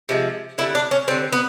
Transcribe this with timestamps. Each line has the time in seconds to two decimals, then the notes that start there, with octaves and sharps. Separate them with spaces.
0.09 C3 F3 G#3
0.58 D3 G3 E4
0.75 D4
0.91 C#4
1.08 G3 C4
1.11 D3
1.33 B3